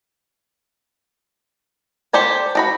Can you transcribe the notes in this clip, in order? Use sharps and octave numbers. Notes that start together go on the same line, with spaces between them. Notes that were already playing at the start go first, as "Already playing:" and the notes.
G4 A4 C5 D5 G#5
D4 F#4 B5